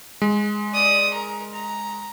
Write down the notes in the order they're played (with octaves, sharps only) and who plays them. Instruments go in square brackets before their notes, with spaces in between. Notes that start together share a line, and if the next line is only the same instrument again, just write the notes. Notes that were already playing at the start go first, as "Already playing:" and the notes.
[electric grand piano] G#3
[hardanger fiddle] D5 D#6
A#4 A#5
A#5